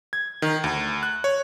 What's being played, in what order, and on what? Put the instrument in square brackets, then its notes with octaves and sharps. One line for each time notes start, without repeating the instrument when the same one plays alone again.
[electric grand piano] G#6
D#3
D2
F#6
C#5